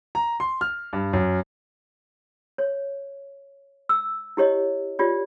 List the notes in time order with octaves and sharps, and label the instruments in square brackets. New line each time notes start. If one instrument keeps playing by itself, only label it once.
[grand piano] A#5
C6
F6
G2
F#2
[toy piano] C#5
E6
E4 G4 C#5 D#5
F4 G4 C#5 D5